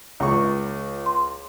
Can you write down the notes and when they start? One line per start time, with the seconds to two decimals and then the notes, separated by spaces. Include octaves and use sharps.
0.20 C#2 C#6
1.06 C6